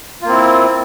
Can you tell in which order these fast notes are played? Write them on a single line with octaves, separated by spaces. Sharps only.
F4 A#3 C4 E4